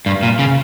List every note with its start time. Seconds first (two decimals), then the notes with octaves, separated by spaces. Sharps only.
0.06 G2
0.23 A#2
0.39 C#3